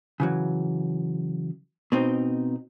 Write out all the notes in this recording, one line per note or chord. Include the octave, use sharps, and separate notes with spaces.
C#3 E3 F#3
B2 C4 D#4